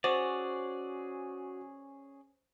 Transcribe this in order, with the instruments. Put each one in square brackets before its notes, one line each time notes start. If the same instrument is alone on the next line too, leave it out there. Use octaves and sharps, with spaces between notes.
[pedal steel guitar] C#4 G#4 D5 [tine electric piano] F#4 [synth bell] C5